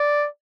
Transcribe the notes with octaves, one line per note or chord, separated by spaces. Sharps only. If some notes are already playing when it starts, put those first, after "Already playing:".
Already playing: D5